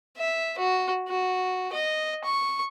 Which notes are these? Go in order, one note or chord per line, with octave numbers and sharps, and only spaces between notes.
E5
F#4
F#4
D#5
C#6